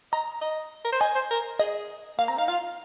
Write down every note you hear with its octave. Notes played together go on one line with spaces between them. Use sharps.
D#5 A#5
D#5
A#4
C5
D#5 G#5
C5
A#4
G#4 D#5
A#3 F5
C4 A#5
D#4 F5
F4 F5